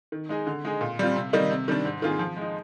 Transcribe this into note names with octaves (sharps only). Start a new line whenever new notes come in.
D#3
G#3 D#4 G#4
D3
G#3 D#4 G#4
A#2
G3 C4 F4
C3
D#3 G3 A#3 D#4
C3
D#3 G3 D4
G#2
D#3 A#3 F4 G#4
F3
G#3 D#4